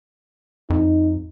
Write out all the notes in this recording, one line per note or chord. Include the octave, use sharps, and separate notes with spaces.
F2 D#4